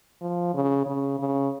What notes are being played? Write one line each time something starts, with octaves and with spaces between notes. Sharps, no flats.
F3
C#3
C#3
C#3